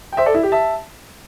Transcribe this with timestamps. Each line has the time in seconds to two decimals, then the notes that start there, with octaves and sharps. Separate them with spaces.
0.12 G5
0.17 C5 E5
0.26 A4 D5
0.34 E4
0.43 G4
0.52 E5 A5